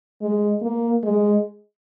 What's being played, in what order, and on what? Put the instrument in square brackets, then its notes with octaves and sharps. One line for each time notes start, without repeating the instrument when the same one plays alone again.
[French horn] G#3
A#3
G#3